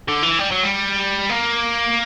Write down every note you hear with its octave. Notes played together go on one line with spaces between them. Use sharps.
D3
E3
G3
F#3
G3
A#3